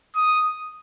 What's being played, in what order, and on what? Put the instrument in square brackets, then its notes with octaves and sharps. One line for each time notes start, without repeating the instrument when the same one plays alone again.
[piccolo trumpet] D#6